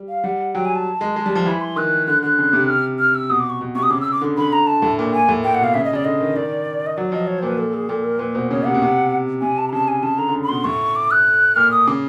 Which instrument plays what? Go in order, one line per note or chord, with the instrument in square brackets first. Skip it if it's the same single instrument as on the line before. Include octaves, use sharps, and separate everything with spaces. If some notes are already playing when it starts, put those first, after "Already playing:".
Already playing: [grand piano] G3
[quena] F5
[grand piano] G3 [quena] F#5
[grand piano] F#3 [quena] G5
[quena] G#5
A5
[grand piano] G#3
G#3
G3
F3
[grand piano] E3 [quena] B5
[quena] C6
[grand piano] D#3 [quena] F#6
[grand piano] D3 [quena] F#6
[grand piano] D3 [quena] F#6
[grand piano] C#3
C3
[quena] F6
F6
E6
[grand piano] B2 [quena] D#6
[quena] D6
C#6
[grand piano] B2
[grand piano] C3 [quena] C#6
[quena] D#6
[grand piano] C#3 [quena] D6
[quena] E6
D6
[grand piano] D3
[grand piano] D3 [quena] B5
[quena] A#5
A5
[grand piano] A2
A#2
[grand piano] A#2 [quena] G#5
[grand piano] A2
[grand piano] A#2 [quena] G5
[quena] F#5
[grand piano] B2 [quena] F5
[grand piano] C#3 [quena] E5
[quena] D#5
[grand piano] C#3 [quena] D5
[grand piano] D3 [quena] D#5
[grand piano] D#3
[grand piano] D#3 [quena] D5
[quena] D#5
[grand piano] F#3 [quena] D5
[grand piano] F3 [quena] D#5
[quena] C#5
[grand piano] A#2 [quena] C5
[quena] B4
A4
G#4
[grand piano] A#2 [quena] A4
[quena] A#4
[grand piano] A#2 [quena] B4
[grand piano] B2 [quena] C5
[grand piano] C#3 [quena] C#5
[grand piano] C3 [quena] F#5
[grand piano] B2
C3
[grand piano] C3 [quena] G#5
[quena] A5
A#5
[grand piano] C#3 [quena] A5
[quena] G#5
[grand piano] C#3 [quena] A5
[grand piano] D3 [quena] A#5
[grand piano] D3
C#3
[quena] B5
[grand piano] B2 [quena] C6
[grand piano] A2 [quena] C#6
[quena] D6
F#6
[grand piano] A#2 [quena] F6
[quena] D#6
[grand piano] C#3 [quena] D6